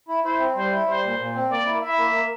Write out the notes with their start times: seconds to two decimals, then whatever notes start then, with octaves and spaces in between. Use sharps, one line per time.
0.08 E4
0.24 E4 C5
0.39 C4
0.55 G3 C5
0.71 E4
0.88 G3 C5
1.03 A#2
1.19 A#2
1.35 C4
1.50 A#3 D5
1.66 E4
1.82 E4 E5
1.98 A#3
2.14 A#3